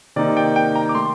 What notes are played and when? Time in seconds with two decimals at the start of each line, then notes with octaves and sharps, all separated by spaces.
0.16 C3 D#3 A#3 D#4 D5
0.37 G5
0.56 G5
0.76 A#5
0.89 D6
0.95 D#3 A3 C6